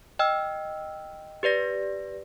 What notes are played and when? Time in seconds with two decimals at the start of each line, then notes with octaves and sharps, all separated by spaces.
0.19 D#5 G5 E6 F6
1.43 G4 B4 D5 A#6